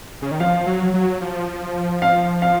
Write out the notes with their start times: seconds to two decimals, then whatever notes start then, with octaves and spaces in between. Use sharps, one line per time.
0.22 C#3
0.31 D#3
0.40 F3 F5
0.66 F#3
0.94 F#3
1.21 F3
2.02 F5
2.42 F5